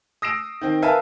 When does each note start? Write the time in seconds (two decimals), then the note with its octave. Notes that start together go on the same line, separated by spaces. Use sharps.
0.22 D#6 E6 A#6 C7 D7 E7
0.61 D#3 C4
0.82 A#4 B4 E5 F5 G#5 A5